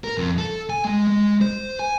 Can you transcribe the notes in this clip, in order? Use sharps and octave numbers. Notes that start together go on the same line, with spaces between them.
A#4
F2
A4
G#5
G#3
G#3
C5
G#5